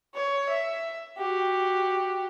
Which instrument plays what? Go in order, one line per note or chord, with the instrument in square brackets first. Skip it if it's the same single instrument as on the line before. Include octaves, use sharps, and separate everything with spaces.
[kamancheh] C#5
E5
F#4 G4